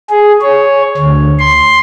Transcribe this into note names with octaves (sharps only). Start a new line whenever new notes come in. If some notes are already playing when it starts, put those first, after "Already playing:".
G#4
C#5
D2
C6